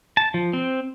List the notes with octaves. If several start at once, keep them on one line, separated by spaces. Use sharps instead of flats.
A5
F3
C4